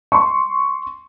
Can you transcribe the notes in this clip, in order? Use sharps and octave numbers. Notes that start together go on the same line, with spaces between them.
C6 C#6